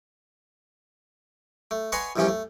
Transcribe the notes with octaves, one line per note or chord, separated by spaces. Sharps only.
A3
B4 C#5 D#5 F#5 G#5 C6
A#1 E2 G2 C3 F3 C#4
A3